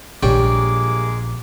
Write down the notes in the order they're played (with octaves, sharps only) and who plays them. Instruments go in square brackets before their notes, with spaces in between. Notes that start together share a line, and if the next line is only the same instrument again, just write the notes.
[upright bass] A#1 [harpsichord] G3 C#5 G5 [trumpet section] G#3 A#3 D6